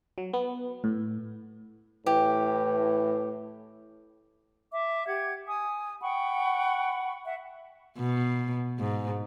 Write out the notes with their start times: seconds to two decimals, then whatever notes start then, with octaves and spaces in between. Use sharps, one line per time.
0.18 F#3
0.34 B3
0.84 A2
2.06 A2 E3 G4
4.71 E5 D6
5.07 G4 F#5 G#6
5.48 G#5 D#6
6.02 F#5 G5 B5 C#6
7.24 E5 F#5
7.98 B2
8.79 G#2